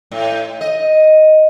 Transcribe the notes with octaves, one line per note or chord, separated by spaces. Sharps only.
A2
D#5